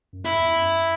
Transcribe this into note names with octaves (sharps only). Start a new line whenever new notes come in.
F#2
E4
E2
F#2